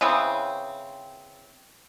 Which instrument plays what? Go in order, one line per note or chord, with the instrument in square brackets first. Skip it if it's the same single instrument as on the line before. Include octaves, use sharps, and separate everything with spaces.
[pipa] C#3 E3 B3 C4